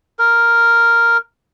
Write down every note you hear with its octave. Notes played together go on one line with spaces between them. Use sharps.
A#4